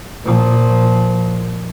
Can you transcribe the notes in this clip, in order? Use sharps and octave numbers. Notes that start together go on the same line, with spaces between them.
A#2 F3